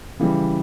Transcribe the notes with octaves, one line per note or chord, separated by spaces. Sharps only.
C#3 E3 G3